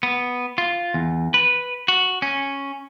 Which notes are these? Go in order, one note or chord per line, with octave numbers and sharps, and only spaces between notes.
B3
F4
E2
B4
F#4
C#4